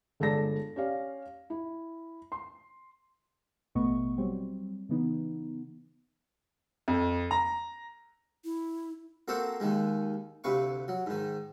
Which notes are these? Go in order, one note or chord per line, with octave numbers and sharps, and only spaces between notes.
G1 G#3 A4 D5 A5 A#6
C#4 G4 D5 F5
E4
C6
A1 B2 A3 B3 D#5 C#6
F#3 G3 C4
C#3 E3 B3 D#4
F2
A#5
E4
A#3 C4 F#4 A4 A#4 C5
D#2 D#3 G#3
D2 C3 B4 F5 C#6
F#3
G#2 D#3